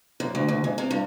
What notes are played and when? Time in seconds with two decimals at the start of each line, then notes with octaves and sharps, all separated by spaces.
0.20 F#2
0.35 D2
0.48 D2
0.64 G#2
0.78 C3
0.91 G2